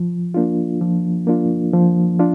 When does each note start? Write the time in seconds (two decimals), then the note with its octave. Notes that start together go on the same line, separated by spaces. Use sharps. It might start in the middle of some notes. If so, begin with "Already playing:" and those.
Already playing: F3
0.34 A#3 D4 F4
0.81 F3
1.27 A#3 D4 F4
1.73 F3
2.19 D4 F4